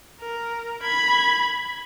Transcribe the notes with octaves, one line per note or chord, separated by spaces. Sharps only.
A#4
B5 G#6